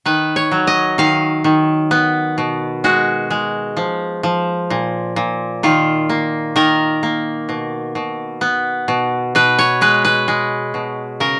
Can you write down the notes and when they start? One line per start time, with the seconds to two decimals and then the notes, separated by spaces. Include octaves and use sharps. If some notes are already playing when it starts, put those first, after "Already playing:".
0.06 D#3 B4
0.36 C#5
0.52 F#3
0.67 D#5
0.98 D#3 F5
1.44 D#3
1.91 B3
2.38 B2
2.84 G#3 F#4
3.30 G#3
3.77 F3
4.23 F3
4.70 A#2
5.16 A#2
5.63 D#3 F4
6.09 A#3
6.56 D#3 A#4
7.03 A#3
7.49 B2
7.95 B2
8.41 B3
8.88 B2
9.35 B2 B4
9.59 C#5
9.81 G#3 B4
10.05 B4
10.28 G#3
10.74 B2
11.20 C#3 A#4